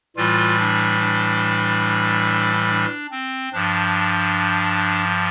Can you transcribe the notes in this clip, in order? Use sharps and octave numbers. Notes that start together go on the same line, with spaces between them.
A2 E3 G3 F4
D4
D4
D4
C4
G2 F3 D4